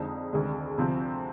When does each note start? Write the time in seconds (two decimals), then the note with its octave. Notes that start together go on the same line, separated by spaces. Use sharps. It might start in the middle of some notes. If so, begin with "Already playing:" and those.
Already playing: F2 D3 G#3 C4 D#4
0.33 D2 C3 D#3 G#3 D4
0.78 D2 C3 F3 C4